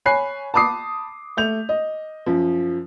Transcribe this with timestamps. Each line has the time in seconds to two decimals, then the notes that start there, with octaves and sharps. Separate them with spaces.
0.05 C#5 G#5 B5 F#6 C7
0.54 A5 B5 D6 D#6 C7
1.37 A3 G6 F7
1.69 D#5
2.26 F#2 F3